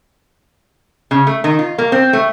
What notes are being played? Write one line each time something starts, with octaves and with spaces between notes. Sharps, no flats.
C#3
A3
D#3
F4
A#3
C4
A3